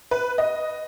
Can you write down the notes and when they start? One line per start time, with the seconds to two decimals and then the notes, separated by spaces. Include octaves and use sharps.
0.11 B4
0.38 D#5